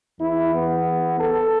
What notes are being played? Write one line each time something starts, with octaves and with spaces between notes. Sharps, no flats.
E2 E3 E4
B3
A4